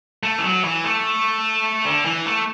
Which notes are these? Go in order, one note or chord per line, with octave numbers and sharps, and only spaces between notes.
A3
E3
F#3
E3
A3
D3
E3
A3